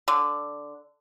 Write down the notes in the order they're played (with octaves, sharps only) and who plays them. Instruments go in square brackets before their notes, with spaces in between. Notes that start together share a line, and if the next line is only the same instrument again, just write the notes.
[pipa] D3